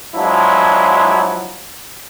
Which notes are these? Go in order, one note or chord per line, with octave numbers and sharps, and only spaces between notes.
F3 F#3 G#3 D4 E4